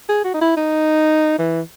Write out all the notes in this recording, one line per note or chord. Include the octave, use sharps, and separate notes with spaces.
G#4
F#4
D#4
E4
D#4
E3